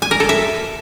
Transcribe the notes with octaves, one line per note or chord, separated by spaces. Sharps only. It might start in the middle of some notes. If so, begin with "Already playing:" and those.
G#5
A#4
A4
E5